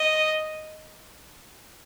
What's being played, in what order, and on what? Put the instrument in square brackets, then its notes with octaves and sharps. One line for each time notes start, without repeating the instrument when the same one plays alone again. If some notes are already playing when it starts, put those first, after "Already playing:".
Already playing: [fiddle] D#5